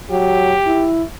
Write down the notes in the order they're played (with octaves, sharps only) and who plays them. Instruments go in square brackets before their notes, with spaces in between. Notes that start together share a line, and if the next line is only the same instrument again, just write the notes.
[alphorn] F#3 [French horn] G4
[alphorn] E4